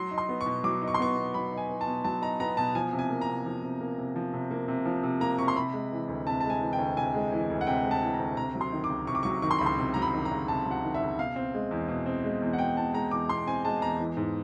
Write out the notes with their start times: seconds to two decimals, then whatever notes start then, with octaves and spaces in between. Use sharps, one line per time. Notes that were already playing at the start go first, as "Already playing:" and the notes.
Already playing: F#3 C6
0.11 D#4
0.18 C6
0.29 B3
0.41 C#6
0.46 B2
0.64 F#3 D6
0.82 D#4
0.88 C#6
0.94 C6
1.00 B3 C#6
1.17 B2
1.34 F#3 B5
1.52 D#4
1.57 G#5
1.70 B3
1.81 A5
1.87 B2
2.04 F#3 A5
2.22 D#4 A#5
2.40 B3 A#5
2.57 B2 A5
2.75 F3 G#5
2.93 C3
2.99 G#5
3.10 A#3
3.21 A#5
3.28 C3
3.46 F3
3.63 C3
3.81 A#3
3.98 C3
4.16 F3
4.33 C3
4.51 A#3
4.68 C3
4.85 F3
5.03 C3
5.20 A#3 A#5
5.38 C3 C#6
5.48 C6
5.56 C3 B5
5.73 G#3
5.92 E3
6.08 D2
6.27 C3 A5
6.41 G#3 A5
6.50 G#5
6.61 E3
6.73 G5
6.79 D2
6.97 C3 G#5
7.14 G#3
7.32 E3
7.50 D2
7.61 F#5
7.67 C3 G5
7.84 G#3
7.91 A5
8.02 E3
8.14 A#5
8.20 D2
8.37 C3 A#5
8.55 F#3
8.61 C6
8.72 D#3
8.84 D6
8.90 C#2
9.07 C3 C#6
9.15 D6
9.23 F#3 C#6
9.42 D#3 C#6
9.51 C6
9.58 C#2 B5
9.66 C6
9.78 C3
9.94 F#3 A#5
10.02 B5
10.14 D#3
10.25 A#5
10.31 C#2
10.48 C3 A5
10.66 F#3 F#5
10.84 D#3
10.94 E5
11.01 C#2
11.19 B2 F5
11.36 C4
11.54 G#3
11.71 E2
11.88 B2
12.06 C4
12.24 G#3
12.42 E2
12.53 F#5
12.59 B2 G5
12.77 C4 A5
12.94 G#3 A#5
13.11 E2 D6
13.29 B2 C6
13.47 C4 G#5
13.65 G#3 A5
13.82 E2 A#5
14.00 E3
14.17 G#2